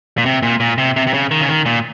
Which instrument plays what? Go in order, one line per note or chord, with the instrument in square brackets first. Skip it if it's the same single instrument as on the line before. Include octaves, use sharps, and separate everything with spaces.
[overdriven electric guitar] A#2
C3
A#2
A#2
C3
C3
C3
C#3
D#3
C#3
D#3
A#2